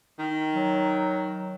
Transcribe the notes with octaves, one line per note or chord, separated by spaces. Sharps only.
D#3
F#3